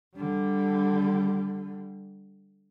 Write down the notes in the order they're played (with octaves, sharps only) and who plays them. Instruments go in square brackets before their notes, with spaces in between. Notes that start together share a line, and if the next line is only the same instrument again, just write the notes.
[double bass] D3 G3